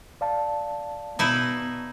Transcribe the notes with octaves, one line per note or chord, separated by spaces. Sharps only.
D5 F5 A5
B2 D#4 E4